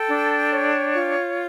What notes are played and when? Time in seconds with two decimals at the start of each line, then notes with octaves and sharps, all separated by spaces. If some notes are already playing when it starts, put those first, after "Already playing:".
Already playing: A4 G5
0.09 D4
0.51 C#5
0.93 F4